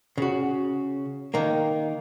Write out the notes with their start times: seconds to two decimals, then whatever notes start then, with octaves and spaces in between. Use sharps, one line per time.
0.18 C#3 F#4
1.34 D#3 A#3